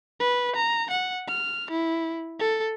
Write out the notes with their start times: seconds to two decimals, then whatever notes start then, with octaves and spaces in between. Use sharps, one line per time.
0.20 B4
0.56 A#5
0.90 F#5
1.28 F6
1.71 E4
2.39 A4